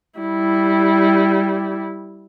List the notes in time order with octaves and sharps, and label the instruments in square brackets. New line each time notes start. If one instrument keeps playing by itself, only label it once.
[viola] G3 E4